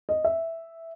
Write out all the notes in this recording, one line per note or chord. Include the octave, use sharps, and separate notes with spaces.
D#5
E5